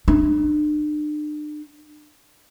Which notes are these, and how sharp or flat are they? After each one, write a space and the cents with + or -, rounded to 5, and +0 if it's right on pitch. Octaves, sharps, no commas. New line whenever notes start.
D4 +40